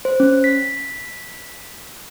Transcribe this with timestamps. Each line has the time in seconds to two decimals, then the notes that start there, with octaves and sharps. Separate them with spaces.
0.05 C5
0.20 C#4
0.44 B6